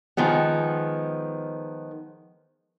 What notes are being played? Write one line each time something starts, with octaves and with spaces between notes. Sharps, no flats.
D#3 F3 G#3 B3